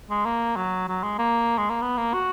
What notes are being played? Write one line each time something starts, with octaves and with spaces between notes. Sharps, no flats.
G#3
A#3
F#3
F#3
G#3
A#3
G#3
A#3
B3
A#3
F#4